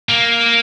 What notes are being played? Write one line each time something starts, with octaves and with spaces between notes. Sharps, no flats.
A#3